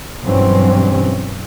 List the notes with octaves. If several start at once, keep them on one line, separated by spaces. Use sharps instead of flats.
G2 B2 E3 F#3 C4 C#4